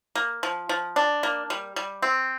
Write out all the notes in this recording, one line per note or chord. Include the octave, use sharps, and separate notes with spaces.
A#3
F3
F3
D4
A#3
G3
G3
C4